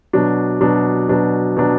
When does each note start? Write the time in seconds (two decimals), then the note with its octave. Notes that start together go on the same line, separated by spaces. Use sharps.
0.13 B2 F#3 D4
0.61 B2 F#3 D4
1.09 B2 F#3 D4
1.57 B2 F#3 D4